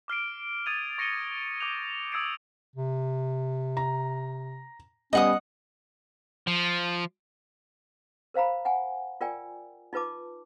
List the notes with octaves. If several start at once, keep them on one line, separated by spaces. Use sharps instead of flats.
D6 F6 C7 D7
D#6 F6 G#6 A6 D#7 F7
C#6 A#6 C#7 D#7 F7 G7
D6 G6 F7
D#6 E6 G#6 C7 D7
C3
A#5
G3 B3 C#4 D#5 F#5 D#6
F3
A#4 C5 F5 A#5 B5
F#5 G#5
F4 A#4 D5 G5 G#5
D#4 F4 B4 A5 D6